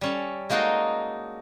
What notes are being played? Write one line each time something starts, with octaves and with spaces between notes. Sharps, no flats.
G3 C#4 A4
G#3 A#3 D#4 F#4 A4 D#5